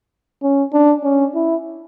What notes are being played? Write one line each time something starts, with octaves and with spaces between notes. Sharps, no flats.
C#4
D4
C#4
E4